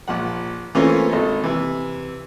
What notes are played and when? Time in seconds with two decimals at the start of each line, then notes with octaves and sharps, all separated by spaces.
0.08 A#1 F3 F#5
0.75 E3 A3 A#3 C4 C#4 F4
1.09 G#1 A4
1.44 C3 E3